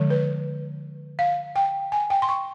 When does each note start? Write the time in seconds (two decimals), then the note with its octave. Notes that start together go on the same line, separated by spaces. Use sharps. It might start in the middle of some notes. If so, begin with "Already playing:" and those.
Already playing: D3 F3 G#3
0.10 B4
1.19 F5
1.56 G5
1.92 G#5
2.10 G5
2.22 C6
2.29 C#6